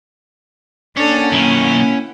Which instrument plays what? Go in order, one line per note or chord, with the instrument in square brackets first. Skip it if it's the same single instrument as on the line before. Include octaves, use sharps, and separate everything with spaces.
[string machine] A#3 F#5 G5 [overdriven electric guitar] C#4 [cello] D4 A4
[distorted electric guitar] B1 D#3 [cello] E4